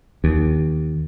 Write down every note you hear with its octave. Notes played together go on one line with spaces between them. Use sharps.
D#2